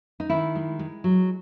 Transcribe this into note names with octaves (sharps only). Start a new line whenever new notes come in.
D#4
D#3 E4
G#3
G#3
F#3